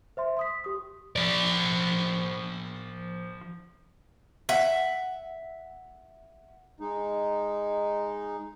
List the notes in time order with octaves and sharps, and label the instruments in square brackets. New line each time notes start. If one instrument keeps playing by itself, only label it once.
[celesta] C5 E5 C6
C6 D#6 B6
G4 D#6
[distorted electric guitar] F3 D5
[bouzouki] E5 F#5
[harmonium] G#3 D#4